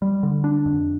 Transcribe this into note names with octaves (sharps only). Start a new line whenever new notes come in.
G3
D3
D4
F2